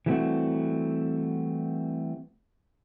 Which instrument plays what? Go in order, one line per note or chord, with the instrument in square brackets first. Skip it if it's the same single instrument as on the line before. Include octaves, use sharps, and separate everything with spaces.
[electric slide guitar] E3 G3 A3 B3 C4 F#4